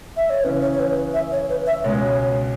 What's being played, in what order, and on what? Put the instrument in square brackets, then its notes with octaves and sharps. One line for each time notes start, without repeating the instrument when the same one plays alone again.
[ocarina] E5
C#5
[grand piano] C#3 E3 C#4 [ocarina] B4
[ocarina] C#5
C#5
B4
B4
E5
C#5
B4
E5
[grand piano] C#2 B2 G#3 [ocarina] C#5